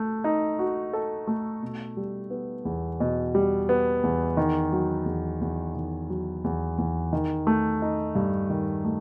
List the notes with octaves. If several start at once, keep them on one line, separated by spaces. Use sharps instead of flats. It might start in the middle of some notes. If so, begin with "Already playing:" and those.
Already playing: A3
D#4
F#4
A4
A3
B2
G3
B3
E2
B2
G3
B3
E2
D#3
F#3
E2
E2
D#3
F#3
E2
E2
D#3
A3
D#4
G2
D#3
A3